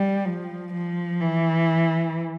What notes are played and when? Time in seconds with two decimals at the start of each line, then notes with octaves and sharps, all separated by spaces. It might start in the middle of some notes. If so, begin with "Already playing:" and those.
Already playing: G3
0.25 F3
0.73 F3
1.21 E3